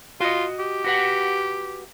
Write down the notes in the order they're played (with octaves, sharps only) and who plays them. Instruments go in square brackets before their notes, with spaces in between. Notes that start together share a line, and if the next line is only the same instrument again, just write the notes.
[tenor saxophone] F4 [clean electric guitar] F#4 D#5
[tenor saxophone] G4
[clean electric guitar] F#4 B4 F#5